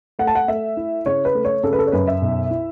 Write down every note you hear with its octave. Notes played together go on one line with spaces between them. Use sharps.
A3 F#5
A5
F#5
A3 E5
E4
C#3 C#5
B4
A3
C#5
C#3 A4
B4
A4
C#5
F#2 B4
E5
B1
E4